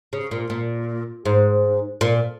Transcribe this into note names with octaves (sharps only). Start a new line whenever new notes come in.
C#3
A#2
A#2
G#2
A#2